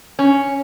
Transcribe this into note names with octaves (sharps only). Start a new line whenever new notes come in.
C#4